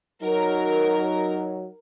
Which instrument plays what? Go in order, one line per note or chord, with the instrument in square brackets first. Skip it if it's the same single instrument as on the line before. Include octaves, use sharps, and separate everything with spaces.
[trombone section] F#3 [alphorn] D#4 [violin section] A#4